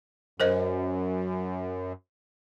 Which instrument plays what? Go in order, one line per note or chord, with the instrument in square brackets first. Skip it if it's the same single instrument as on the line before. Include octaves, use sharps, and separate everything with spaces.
[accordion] F#2 [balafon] A#4 C5 D#5